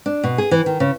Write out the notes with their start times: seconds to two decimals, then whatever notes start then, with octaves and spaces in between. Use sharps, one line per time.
0.06 D4
0.24 B2
0.38 G#4
0.51 E3
0.66 D#3
0.80 C#3